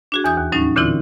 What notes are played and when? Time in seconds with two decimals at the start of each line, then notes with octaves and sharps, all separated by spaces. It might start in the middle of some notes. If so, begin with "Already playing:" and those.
0.12 D4 F#4 G#4
0.24 E2 E3 D#6 G6
0.37 D#2
0.52 A2 F#3 G3 C#4 D#4
0.76 A#2 D3 E3 C4 E4 F4